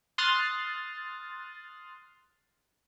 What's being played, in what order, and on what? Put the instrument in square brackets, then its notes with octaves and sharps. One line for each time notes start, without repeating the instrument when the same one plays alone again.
[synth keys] C6 D#6 F6 F#6 A6